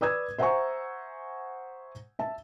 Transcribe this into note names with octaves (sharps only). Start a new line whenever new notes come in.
B4 D5 D#6 E6 G#6
C5 E5 F#5 G#5 A#5 C#6
E5 A5